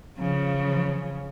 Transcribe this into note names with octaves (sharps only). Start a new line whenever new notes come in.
C#3 F3